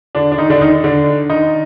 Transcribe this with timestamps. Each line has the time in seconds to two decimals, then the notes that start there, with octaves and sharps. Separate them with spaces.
0.15 D3 D4
0.32 D4
0.38 D#3 D#4
0.50 D3 D4
0.61 D#3 D#4
0.84 D3 D4
1.30 D#3 D#4